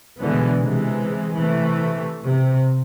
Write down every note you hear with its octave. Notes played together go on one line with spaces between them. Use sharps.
B2 D3 E3 G#3 B3
C3 E3 G#3
C3 E3 A3
C3